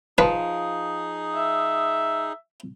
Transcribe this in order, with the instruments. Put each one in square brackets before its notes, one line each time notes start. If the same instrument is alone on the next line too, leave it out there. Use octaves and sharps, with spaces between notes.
[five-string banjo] F3 [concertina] D#4 G#4 [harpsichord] B4
[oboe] E5